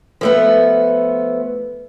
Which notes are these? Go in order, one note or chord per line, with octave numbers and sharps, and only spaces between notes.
F3 A3 B3